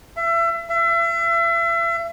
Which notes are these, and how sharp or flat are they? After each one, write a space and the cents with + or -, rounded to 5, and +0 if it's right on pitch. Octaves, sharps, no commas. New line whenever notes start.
E5 +30
E5 +35